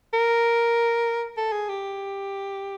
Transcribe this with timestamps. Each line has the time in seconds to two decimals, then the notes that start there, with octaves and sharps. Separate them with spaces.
0.14 A#4
1.37 A4
1.52 G#4
1.69 G4